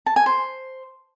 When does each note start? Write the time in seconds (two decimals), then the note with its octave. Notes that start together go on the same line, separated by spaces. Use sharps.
0.06 A5
0.16 G#5
0.26 C5